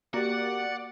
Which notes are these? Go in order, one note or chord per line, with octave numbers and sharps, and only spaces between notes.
A#3 F#4 G4 D5 F#5